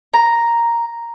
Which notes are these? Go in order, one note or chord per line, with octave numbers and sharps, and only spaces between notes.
A#5